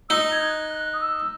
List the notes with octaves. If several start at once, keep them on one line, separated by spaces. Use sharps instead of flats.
D#4 E6
G#6
F#6
F#6
D#6
E6